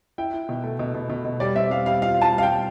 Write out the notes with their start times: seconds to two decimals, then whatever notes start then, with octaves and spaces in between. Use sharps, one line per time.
0.18 E4 G5
0.34 E4
0.49 B2
0.64 A3
0.79 B2
0.94 B2
1.09 B2
1.25 B2
1.40 G3 D5
1.55 C4 E5
1.71 G3 F5
1.86 G3 F5
2.02 F4 F5
2.17 F4 A5
2.32 G3
2.38 F5
2.43 G3 G5